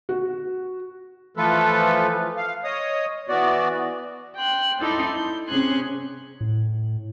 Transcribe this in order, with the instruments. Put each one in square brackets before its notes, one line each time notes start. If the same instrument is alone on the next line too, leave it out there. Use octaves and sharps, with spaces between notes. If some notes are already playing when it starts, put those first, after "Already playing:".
[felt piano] F#4
[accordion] E3 F3 A3 F4 A4 B4
F5
C#5 D#5 D#6
E3 B3 F#4 D5
[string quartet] G5 C6 F#6
D#4 E4 A4 D5 C6
G6
C3 C#4 G#4 G#5 C6 F#6
[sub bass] A2